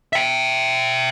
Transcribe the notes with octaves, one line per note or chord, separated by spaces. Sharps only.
E5 G5